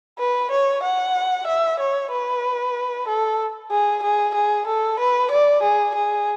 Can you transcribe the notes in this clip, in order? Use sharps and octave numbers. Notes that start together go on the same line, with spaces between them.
B4
C#5
F#5
E5
C#5
B4
A4
G#4
G#4
G#4
A4
B4
D5
G#4
G#4